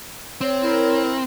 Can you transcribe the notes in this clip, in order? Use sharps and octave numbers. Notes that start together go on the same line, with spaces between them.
C4 C#5
E4 A#4